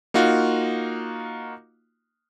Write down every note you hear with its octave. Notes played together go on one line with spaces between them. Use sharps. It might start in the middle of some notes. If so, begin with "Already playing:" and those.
A#3 D#4 F4 F#4